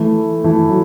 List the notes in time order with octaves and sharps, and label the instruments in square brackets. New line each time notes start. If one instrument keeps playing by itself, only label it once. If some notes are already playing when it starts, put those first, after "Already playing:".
Already playing: [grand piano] E3 A3
E3 A3
F#3